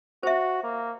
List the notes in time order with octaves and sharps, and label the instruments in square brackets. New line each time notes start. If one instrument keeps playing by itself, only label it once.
[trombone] F#4 [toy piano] C5 E5
[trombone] A#3